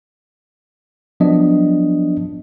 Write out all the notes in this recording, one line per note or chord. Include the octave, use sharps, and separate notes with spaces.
F3 F#3 B3 D4 D#5